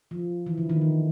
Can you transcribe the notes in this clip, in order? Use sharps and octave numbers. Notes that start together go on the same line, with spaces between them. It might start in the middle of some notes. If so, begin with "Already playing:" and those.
F3
E3
D3
D#3
D3